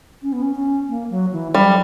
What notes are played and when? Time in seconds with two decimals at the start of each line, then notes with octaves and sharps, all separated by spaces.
0.23 C#4
0.33 B3
0.42 C#4
0.55 C#4
0.89 A#3
1.10 F#3
1.33 E3
1.54 F#3 G3